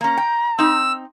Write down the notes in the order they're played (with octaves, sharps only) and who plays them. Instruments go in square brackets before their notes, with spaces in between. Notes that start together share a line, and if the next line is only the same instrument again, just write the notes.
[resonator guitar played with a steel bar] A#3 C#4 [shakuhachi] A#5
[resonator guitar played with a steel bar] G5
[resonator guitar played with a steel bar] C4 D#4 [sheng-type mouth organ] E6